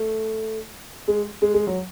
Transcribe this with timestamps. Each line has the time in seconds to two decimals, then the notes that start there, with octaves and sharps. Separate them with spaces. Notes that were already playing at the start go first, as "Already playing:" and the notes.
Already playing: A3
1.08 G#3
1.42 G#3
1.54 G#3
1.67 F#3